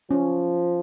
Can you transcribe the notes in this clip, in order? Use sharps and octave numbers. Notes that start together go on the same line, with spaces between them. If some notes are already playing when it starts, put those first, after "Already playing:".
F3 C#4